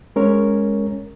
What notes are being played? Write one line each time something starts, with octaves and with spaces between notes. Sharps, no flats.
G#3 C#4 A#4 C#5